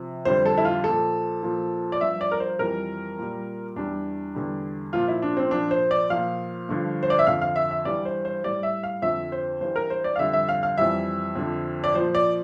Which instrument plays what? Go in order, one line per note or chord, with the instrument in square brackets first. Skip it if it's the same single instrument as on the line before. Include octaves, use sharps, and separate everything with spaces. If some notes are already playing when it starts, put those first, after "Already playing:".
Already playing: [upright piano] C3 F3
F2 D3 G3 C5
A4
E4
F4
A#2 F3 A4
A#2 F3
D5
G2 F3 E5
D5
A#4
C5
F2 E3 G3 A#4
A#2 G3
E2 E3 G3 D4
E2 D3 G3
A#2 F3 F4
E4
D4
C4
A#2 F3 D4
C5
D5
A#2 F3 F5
G2 D3 F3
C5
D5
E5
F2 D3 F3 F5
F5
E5
E5
G2 E3 G3 D5
C5
C5
A2 G3 D5
E5
F5
F2 D3 F3 E5
C5
G2 E3 G3 C5
A#4
C5
D5
F5
F2 D3 G3 E5
E5
F5
F5
F2 E3 G3 E5
F2 D3 F3
D5
A#2 F3 C5
D5